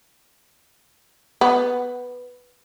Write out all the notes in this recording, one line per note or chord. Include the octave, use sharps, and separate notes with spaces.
B3